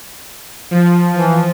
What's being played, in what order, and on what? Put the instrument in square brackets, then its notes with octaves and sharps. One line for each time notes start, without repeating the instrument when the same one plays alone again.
[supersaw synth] F3
[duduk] E3 [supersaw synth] F3